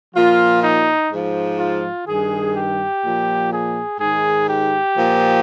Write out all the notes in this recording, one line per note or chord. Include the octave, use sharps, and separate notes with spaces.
A#2 F3 F4
D#4
G#2 F3
F4
G2 D#3 G#4
G4
A#2 F3
G#4
G#2 D#3 G#4
G4
A#2 F3